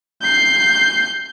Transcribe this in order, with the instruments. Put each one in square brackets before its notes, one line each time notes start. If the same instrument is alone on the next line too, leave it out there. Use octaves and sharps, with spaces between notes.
[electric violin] G6 C7